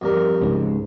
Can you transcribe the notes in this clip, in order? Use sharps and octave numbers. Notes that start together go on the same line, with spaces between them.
F2 G3 A#4
C#2 G#2